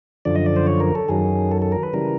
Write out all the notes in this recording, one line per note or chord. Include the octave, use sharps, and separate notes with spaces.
F#2 D3 F3 D5
D#5
D5
C5
C#5
A#4
A4
F#2 D#3 F#3 G#4
A4
A4
A#4
B4
C#3 E3 G3 A#4